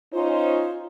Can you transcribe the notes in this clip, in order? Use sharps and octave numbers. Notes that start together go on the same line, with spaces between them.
C#4 D#4 F4 C5